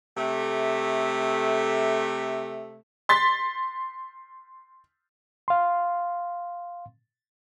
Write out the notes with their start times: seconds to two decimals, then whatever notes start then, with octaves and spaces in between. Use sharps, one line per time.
0.17 C3 A3
3.09 C6 A6 B6
5.48 F5 C6